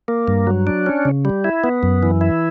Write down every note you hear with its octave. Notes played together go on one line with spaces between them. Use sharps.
A#3
G2
F#3
D4
C#4
C#3
G3
E4
B3
F#2
E3
E4